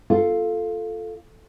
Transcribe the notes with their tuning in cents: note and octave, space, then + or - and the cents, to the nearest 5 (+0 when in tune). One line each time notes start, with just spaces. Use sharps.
F4 +0 A4 +0